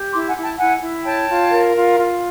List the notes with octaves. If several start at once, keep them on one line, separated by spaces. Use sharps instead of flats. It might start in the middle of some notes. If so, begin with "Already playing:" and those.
Already playing: G4
E4 C6 D6
F#5 G#5
E4
G5 A5
E4 F#5 G#5
E4
C#5 G5 A5
F4
A#4
F4
F4